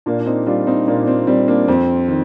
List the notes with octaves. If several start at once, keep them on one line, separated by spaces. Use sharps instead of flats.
A#2 A#3 D4
D4
C4 D#4
G3 D4 F4
C4 D#4
A#2 A#3 D4
C4
G3 C4
A#3 D4
F2 C4
D#3